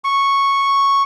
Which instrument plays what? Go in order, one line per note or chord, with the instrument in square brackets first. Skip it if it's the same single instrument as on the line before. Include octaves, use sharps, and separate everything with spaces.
[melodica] C#6